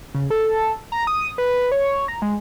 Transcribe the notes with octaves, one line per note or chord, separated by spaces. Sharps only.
C#3
A4
A#5
D#6
B4
C#5
A#5
G#3